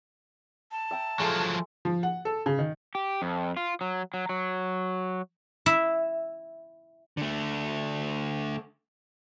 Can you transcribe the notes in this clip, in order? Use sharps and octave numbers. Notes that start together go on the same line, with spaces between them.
A5
E5 G5 A#5
F3 F#3 G#3 A3
F3
F#5
A4
C#3
D#3
G4
F2
F4
F#3
F#3
F#3
E4 E5
D3 A3